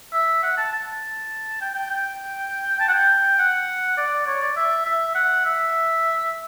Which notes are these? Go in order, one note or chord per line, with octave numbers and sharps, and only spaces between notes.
E5
F#5
A5
A5
G5
G5
G5
A5
F#5
G5
F#5
D5
C#5
D5
E5
E5
F#5
E5